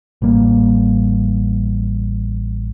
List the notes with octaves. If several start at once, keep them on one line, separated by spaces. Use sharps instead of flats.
A1 G3 A#3